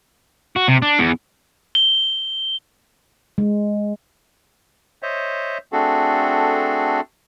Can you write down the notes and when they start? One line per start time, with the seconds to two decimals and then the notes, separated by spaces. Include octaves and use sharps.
0.56 F#4
0.68 C3
0.82 D4
0.99 E2
1.75 G7
3.38 G#3
5.03 C5 C#5 D#5 E5
5.72 A3 C4 D4 F#4 G#4 A4